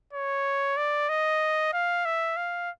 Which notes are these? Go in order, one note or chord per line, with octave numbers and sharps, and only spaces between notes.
C#5
D5
D#5
F5
E5
F5